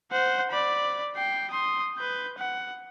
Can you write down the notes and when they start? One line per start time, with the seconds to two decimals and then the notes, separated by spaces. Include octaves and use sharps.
0.11 C5 F#5
0.51 D5 B5
1.16 G5 C7
1.51 C6 D#6
1.98 B4 G6
2.38 F#5